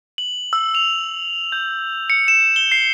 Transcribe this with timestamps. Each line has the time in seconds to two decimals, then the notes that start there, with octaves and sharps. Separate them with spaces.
0.18 F#7
0.53 E6
0.75 F7
1.52 G6
2.10 C#7
2.28 E7
2.56 G7
2.72 C7